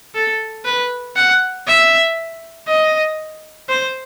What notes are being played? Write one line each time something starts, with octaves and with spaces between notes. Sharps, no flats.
A4
B4
F#5
E5
D#5
C5